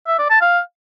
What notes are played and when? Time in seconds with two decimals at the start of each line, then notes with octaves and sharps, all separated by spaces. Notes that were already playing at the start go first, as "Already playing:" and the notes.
0.07 E5
0.18 D5
0.30 A5
0.41 F5